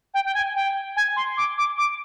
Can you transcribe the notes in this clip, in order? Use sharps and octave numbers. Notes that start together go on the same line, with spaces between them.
G5
G5
G#5
G5
G#5
C6
D6
D6
D6